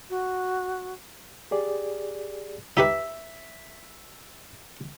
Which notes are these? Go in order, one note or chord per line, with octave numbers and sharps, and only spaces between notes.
F#4
G4 G#4 D5
D#4 G4 B4 E5